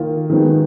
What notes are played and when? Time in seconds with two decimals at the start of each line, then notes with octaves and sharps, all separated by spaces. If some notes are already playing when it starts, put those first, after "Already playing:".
Already playing: D#3 A#3 F4
0.30 D#3 G#3 B3 D#4 F#4